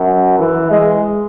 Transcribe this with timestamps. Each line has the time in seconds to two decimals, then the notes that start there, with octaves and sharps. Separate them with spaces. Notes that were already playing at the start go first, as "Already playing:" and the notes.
Already playing: F#2
0.39 E3
0.71 G#3